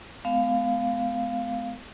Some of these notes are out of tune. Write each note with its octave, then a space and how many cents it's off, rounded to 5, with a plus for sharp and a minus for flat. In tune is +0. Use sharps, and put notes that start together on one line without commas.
G#3 +40 B3 +35 F5 +0